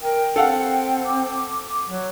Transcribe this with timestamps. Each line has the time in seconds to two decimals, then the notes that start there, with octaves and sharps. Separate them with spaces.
0.01 A#4 G5
0.36 C4 A4 F5 F#5
0.70 G5
1.06 D6
1.89 F#3